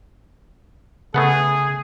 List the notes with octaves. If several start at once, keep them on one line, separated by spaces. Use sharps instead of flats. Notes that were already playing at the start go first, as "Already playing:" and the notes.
C#3 A3 B3 G#4 F#5